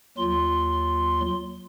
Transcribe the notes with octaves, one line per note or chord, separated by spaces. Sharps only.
D#2 F#3 F4 C6